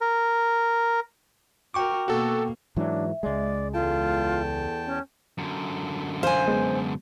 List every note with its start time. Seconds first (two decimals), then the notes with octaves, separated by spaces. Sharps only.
0.01 A#4
1.74 F#4 A#4 G5 C#6 D6
2.08 B2 A#3 F#4 A4
2.77 G#2 E3 F#3 D4 E5
3.23 C#2 G#3 D5
3.74 E2 F4 A4 G5 A5
4.86 C#4
5.38 F#2 D3
6.23 C5 F5 G#5
6.48 G#3 B3